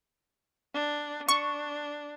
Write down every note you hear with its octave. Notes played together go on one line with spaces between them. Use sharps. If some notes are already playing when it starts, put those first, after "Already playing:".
D4
D4 C#6